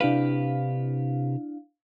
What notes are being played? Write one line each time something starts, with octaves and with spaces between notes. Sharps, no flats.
C3 D4 E4 G4 B4 F5